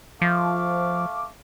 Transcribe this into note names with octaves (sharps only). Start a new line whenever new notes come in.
F3 A3 F5 D6